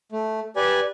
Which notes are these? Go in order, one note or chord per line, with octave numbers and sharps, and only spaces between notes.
A3
G4 B4 D5 G#5